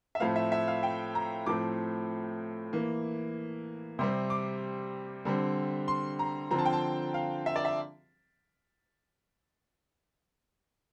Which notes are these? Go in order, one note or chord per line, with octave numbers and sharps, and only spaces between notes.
E5
A2 F3 A3 C4 F5
E5
E5
F5
G5
A#5
A2 F3 A3 C4 D6
E3 A#3
C3 G3 C4 C6
D6
D3 G3 C4
C6
A#5
D3 F3 C4 A#5
A5
G5
A5
F5
E5
D5
E5